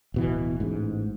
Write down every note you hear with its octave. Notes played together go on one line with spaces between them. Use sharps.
D1 B2 E3
A1 G#2